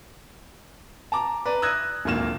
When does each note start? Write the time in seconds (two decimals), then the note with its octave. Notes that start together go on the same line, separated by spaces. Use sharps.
1.12 A5 A#5 D6
1.46 B4 D5 A#5
1.62 D#6 E6 F#6 G#6 A#6 D#7
2.05 D1 G#1 A#2 A#3 F6 E7